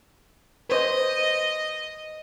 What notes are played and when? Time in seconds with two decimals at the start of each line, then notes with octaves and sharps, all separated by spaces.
0.69 B4 C5 D#5